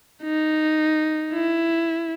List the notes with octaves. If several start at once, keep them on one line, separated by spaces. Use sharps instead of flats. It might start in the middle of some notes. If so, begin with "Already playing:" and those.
D#4
E4